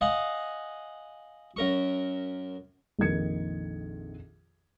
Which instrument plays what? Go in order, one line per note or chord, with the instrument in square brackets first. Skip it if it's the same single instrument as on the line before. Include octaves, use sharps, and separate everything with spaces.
[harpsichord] D#5 F5 F#5 G#5 C6
F#2 A#4 C#6
[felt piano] A#1 F2 D#3 A#3 G#6 C#7